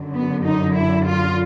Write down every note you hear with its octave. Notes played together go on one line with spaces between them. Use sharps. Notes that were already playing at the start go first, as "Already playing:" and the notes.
Already playing: F#2 D3 F#3
B3
D#4
E4
F4